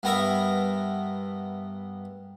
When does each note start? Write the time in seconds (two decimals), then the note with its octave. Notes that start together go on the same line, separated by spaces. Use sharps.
0.03 G2 B3 A#4 E5